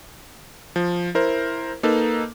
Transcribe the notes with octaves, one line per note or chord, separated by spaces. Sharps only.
F3
E4 A#4 C5
A#3 D#4 A4 B4